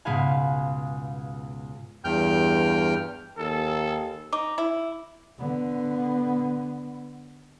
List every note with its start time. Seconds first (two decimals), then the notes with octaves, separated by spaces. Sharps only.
0.05 C#2 G#2 B2 B4 F5 G#5
2.04 E2 G2 G5 F6 G6
3.38 D#2 A4
4.33 D#4 D6
4.58 E4
5.38 D3 B3